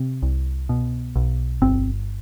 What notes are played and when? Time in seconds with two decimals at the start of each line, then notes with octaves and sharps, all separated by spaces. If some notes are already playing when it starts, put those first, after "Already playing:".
Already playing: C3 C4
0.22 C2
0.69 B2
1.16 B1
1.62 G1 C4